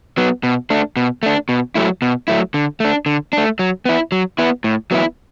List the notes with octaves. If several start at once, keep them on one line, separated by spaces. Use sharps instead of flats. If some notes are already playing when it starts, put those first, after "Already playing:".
F#3 B3
B2
A3 D4
B2
A3 D4
B2
F#3 A3 E4
B2
F#3 A3 E4
D3
A3 D4
D3
A3 D4
F#3
B3 E4
F#3
B3 E4
A2
F#3 B3 E4